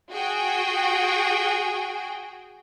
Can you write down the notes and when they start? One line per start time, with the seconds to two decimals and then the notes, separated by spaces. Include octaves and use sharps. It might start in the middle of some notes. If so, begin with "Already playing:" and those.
0.11 F#4 G#4 G5